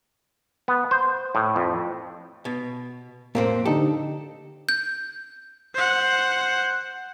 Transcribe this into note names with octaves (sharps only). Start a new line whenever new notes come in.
B3
C5
A2
F2
B2
F2 A2 A#3 C4 C5
D3 D#4 G4 A4
G6
C5 F#5